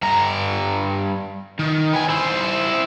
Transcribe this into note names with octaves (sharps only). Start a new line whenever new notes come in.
G2 A#5
D#3
B3 G#5
E4 C5